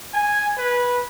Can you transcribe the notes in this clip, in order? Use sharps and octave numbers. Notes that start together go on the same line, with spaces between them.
G#5
B4